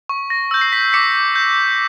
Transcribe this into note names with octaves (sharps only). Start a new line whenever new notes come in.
C#6
A#6
E6 G6
C7
B6
D6 B6 C#7
G6